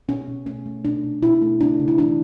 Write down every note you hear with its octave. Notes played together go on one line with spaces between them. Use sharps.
B2 C#4
B2
A3 C#4
A3
B2 D4
B2
B2 E4
A3
C#3 D4
C#3
E4
E3 D4